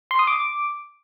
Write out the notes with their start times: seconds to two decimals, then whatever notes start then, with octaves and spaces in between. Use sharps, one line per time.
0.11 C6
0.19 D#6
0.27 D6